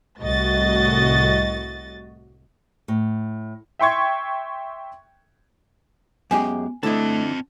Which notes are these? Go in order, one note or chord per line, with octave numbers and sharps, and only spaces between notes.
C2 A2 F#4 D#5 A6
A2
E5 G5 C6 C#6 G#6
F#2 G#3 B3 G4 G#5
D3 A3 C4 E4 D#5 A5